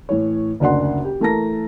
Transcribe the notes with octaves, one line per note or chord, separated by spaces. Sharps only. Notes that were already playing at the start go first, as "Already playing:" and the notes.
A2 E3 C#5
F#1 D2 D4 F#5 C6
G4
E3 A3 A#4 A5 A#5 A#6